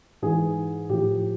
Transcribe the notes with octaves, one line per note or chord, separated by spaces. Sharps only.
G#2 E3 G#4
A2 F3 G4